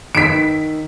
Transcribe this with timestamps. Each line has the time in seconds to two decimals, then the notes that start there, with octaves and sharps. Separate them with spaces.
0.15 D#3 B6 D7